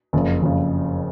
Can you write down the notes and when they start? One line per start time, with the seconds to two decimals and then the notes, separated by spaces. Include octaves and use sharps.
0.13 F#1 F2 C#3
0.42 F#1 F2 C#3